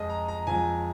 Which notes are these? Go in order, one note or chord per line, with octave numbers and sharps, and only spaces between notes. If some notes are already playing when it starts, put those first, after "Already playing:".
Already playing: F2 F3 G#3 D#5
A#5
A#5
F2 F3 G#3 G#5